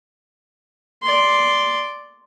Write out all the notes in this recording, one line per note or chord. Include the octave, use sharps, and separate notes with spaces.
D5 C6